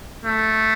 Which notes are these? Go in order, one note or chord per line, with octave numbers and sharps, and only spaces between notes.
A3